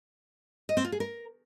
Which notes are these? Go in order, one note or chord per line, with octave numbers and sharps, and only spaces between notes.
D#5
C4
F4
G#4
A#4